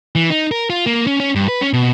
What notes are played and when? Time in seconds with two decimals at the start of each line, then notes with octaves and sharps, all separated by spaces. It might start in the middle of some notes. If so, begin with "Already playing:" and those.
0.15 E3
0.30 D#4
0.51 A#4
0.70 F4
0.86 A#3
1.07 C#4
1.20 C#4
1.35 G2
1.48 B4
1.62 C#4
1.73 B2